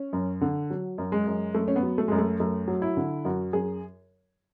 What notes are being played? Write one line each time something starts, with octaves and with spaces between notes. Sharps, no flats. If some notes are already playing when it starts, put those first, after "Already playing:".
Already playing: C#4
F#2
D3
F#3
F#2
G#3
F#2
F#2 A3
C#4
B3
F#3
A3
F#2 G#3
A3
F#2 A3
F#3
E4
D3
F#2 F#4
F#2 G#4